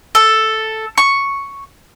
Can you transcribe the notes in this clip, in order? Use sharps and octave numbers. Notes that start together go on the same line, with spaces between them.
A4
C#6